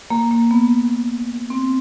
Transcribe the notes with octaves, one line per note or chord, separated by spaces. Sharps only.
A#3
A#3
B3
C4